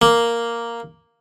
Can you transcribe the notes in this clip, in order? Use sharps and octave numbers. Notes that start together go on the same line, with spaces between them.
A#3